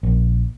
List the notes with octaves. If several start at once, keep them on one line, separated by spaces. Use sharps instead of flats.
A#1